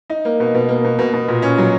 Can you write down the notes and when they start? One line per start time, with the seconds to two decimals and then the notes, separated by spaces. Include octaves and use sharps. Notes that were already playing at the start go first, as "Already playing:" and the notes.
0.10 D#4
0.25 A#3
0.40 B2
0.54 B2
0.69 A#3
0.85 B2
0.99 B2
1.13 B2
1.28 A#2
1.42 C#4
1.58 F#3